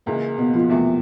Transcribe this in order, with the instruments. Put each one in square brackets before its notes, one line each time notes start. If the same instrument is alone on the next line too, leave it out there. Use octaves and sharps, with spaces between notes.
[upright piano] C#2 C#3 E3 [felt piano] A#3
[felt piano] B2 B3
F3 F4
[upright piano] E2 C3 E3 A3